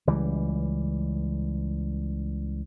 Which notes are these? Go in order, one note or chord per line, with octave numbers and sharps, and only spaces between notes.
C#2 E3 G3